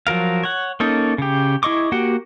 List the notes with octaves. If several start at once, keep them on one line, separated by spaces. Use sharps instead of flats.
F3 F#3 A#4 F5
C#5 F#5
A#3 C#4 D#4 A4
C#3 G4
E4 G#4 D#5 C#6 D6
A#3 F#4 G4 F#5